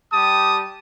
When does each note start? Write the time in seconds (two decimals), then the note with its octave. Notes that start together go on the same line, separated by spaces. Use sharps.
0.13 G3 G4 A5 D#6